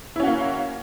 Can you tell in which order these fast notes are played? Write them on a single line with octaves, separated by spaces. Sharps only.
E4 C#4 F#4 A#3